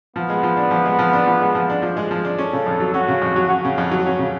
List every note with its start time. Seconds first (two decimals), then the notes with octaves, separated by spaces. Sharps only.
0.16 F3 B3
0.30 G#3
0.43 F3
0.57 D4
0.71 F3
0.86 G#3
0.99 F3
1.13 D4
1.27 F3
1.42 G#3
1.55 F3
1.70 D4
1.82 F3
1.97 G#3
2.11 F3
2.25 D4
2.38 C#4 A4
2.53 C#3
2.66 F2
2.80 F#3
2.94 C#4 F#4
3.08 C#3
3.22 F2
3.36 F#3
3.50 C#4 F#4
3.65 C#3
3.78 F2
3.91 F#3
4.06 C#4
4.19 C#3